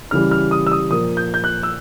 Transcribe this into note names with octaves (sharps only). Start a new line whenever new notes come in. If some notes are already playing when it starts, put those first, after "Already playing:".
C#3 E3 G3 F6
F6
D#6
E6
D#6
A#2 F3 A#3 D#6
G6
G6
F#6
E6